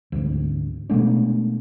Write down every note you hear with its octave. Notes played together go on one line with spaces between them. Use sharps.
G#1 D2
B2 G#3 A3 D4